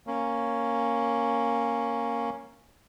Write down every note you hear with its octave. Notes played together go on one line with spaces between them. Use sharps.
A#3 C#4